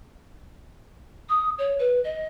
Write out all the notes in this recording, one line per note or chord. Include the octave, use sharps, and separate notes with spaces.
D#6
C#5
B4
D#5